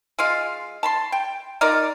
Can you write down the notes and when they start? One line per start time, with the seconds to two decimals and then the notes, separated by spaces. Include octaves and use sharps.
0.19 G#3 F4 F5
0.83 A5 B5 C6
1.12 G5
1.61 D#4 F4 A#4 D5